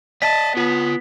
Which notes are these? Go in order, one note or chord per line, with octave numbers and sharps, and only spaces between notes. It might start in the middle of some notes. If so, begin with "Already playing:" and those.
D5 D#5 A5 B6
B3 F4 C#5